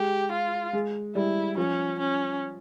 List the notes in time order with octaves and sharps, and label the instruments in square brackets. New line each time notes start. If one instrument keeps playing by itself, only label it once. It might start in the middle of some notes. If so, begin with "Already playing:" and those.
Already playing: [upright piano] G#3 [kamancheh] G4
[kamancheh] F4
[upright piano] G#3
[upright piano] G3 [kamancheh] E4
[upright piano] F3 [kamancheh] C#4
[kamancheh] C#4